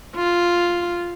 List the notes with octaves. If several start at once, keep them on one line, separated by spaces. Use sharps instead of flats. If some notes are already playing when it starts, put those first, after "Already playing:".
F4